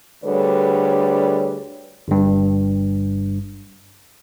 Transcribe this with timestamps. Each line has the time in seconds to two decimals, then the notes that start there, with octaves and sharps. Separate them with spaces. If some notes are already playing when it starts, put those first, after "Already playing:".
0.24 D2 D3 G3 G#4 B4 C#5
2.08 G1 G2